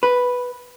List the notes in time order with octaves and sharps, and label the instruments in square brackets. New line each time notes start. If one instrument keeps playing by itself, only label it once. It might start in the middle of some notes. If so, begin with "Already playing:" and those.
[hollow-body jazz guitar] B4